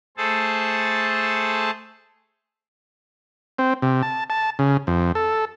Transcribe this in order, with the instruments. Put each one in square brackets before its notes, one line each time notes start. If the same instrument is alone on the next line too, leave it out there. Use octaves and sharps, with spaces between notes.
[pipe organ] A3 G#4 A4 C5 A5
[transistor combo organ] C4
C3
A5
A5
C#3
F2
A4